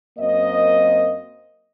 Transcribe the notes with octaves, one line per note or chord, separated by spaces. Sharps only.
F#2 A#3 C4 D#5